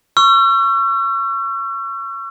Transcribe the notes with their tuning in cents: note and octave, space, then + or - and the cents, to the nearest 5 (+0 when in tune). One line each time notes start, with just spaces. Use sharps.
C#6 +0 E6 +45